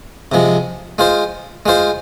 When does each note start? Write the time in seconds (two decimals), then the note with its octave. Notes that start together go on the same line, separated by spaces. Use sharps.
0.32 C3 F3 G#3
0.98 G#3 F4 C5
1.66 G#3 F4 C5